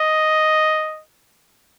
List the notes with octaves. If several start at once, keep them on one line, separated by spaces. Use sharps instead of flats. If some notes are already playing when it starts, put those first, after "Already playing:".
Already playing: D#5